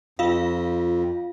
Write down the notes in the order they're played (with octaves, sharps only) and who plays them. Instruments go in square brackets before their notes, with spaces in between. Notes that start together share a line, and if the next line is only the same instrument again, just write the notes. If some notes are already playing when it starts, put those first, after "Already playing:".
[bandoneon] F2 [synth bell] F4 F5